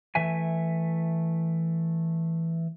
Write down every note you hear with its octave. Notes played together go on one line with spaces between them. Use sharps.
E3 A3 E5 G#5